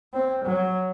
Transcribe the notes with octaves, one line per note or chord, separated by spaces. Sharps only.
C4
F#3